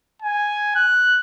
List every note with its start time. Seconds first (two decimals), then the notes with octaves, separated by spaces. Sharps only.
0.22 G#5
0.76 F#6